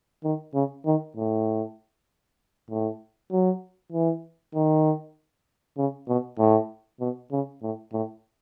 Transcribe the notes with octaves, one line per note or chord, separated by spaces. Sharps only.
D#3
C#3
D#3
A2
A2
F#3
E3
D#3
C#3
B2
A2
B2
C#3
A2
A2